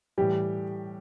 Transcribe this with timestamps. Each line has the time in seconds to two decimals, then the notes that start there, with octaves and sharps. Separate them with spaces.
0.18 A2 E3 G3 G4